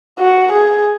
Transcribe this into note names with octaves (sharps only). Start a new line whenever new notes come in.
F#4
G#4